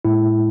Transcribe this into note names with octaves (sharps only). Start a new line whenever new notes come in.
A2 G#3 E4